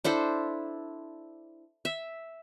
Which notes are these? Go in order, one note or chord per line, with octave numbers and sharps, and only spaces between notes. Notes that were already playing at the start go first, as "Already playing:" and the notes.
D4 E4 A4 C5
E5